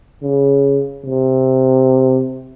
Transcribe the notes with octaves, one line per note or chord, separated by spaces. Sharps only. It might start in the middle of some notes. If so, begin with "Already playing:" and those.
C#3
C3